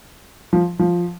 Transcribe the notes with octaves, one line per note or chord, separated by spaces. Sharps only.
F3
F3